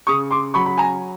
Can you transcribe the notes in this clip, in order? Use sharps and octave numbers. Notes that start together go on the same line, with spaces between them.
C#3 C#6 D#6
C6 D6
F#3 B5 C#6
B5
G#5 A#5